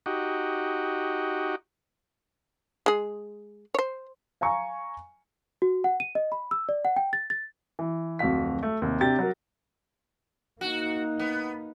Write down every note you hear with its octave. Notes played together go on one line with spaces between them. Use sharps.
D#4 F#4 G4
G#3 G#4
C5 C#5
F5 G#5 A#5 C#6
F#4
F#5
D#7
D#5
B5
E6
D5
F#5
G5
A6
A6
E3
D1 F2 F#4 F5 B6
A3
D#2 C3
C3 D4 G4 A6
F#3 A#4
A#3 D#4 F#4
B3